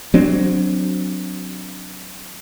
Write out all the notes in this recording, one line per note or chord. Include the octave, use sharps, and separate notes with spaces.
F#3 C4 D4